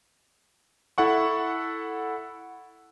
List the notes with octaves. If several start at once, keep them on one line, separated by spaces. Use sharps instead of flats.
E4 A4 F#5 C#6